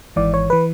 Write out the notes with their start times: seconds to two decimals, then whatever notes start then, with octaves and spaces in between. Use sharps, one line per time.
0.16 G#1 G#2 E3 D5
0.34 C#5
0.50 E3 B4